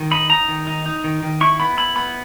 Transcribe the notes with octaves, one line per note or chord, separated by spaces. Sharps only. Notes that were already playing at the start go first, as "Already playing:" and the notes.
Already playing: D#3
D#4 B5
D#4 A#5
D#3
D#4
D#4
D#3
D#3
E4 C#6
B3 B5
E4 B5
B3 B5